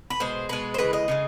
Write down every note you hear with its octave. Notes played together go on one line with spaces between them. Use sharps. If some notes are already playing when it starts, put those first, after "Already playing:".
B4
B2 G#3 C5
B2 G#3 B4
C5
C#3 E3 G#3 B4
D#5
C#3 E3 G#3